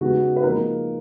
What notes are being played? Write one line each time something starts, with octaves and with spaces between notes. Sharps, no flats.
C#3 G#3 B3 D#4 F#4
B4
F3 G#3 A#3 D#4 A#4